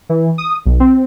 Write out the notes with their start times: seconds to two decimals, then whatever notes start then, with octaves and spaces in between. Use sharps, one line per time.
0.09 E3
0.38 D#6
0.66 B1
0.80 C4